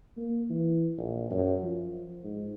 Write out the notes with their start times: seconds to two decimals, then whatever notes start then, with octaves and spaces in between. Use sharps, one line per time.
0.17 A#3
0.50 E3
0.98 A#1
1.31 F#2
1.63 F3
2.24 G#2